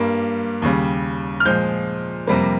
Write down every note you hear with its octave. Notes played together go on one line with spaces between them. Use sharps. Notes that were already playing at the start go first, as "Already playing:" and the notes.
Already playing: G2 G3 A#3
D#2 C#3 G3
F6
A#2 F3 G#3 G6
F2 C3 G3 A#3